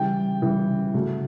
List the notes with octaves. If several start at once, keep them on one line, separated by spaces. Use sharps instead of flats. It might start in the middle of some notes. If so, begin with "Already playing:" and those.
Already playing: C#3 E3 G3 G5
C#3 E3 G3
C#3 F#3 A3